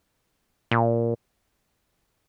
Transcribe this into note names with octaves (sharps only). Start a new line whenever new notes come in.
A#2